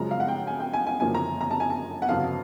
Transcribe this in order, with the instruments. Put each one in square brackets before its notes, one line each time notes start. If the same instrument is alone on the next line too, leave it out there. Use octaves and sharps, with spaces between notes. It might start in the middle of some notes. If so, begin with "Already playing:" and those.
Already playing: [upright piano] F#2 C#3 F3 G#3 A#5
F5
F#5
G5
G#5
G5
G#5
G#5
F#1 F#2 D3 F3 A#3 G#5
A#5
A#5
A5
G#5
A5
F#5
G1 F2 C#3 F#3 F5